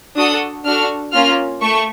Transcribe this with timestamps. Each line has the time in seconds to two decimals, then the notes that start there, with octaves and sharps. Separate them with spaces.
0.16 D4 F#4 A4 D#6
0.66 D4 F#4 A4 F6
1.13 A#3 C#4 F4 F6
1.61 A3 C#6